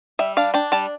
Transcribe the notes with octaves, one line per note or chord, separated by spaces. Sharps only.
G3 E5
D4 F5
D4 G5
G3 A5